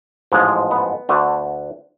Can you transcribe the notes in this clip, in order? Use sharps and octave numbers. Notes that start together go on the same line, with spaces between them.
A1 G#2 F3 G#3
B3
D2 D3 A3